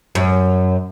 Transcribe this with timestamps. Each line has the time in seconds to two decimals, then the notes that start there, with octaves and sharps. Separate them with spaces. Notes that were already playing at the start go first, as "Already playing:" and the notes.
0.15 F#2